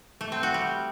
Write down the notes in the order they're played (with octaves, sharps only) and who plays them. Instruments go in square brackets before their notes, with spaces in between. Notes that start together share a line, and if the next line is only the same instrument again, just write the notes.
[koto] A3
C4
F#4
G3